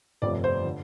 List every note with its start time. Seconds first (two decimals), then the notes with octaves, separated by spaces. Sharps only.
0.22 G1 F2 C3 F3 A3 D5
0.44 C5
0.65 D3